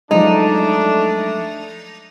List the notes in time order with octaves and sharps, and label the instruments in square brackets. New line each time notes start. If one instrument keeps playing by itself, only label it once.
[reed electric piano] F3 F#3 G#3 [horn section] A3 D4 [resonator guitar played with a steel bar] D#4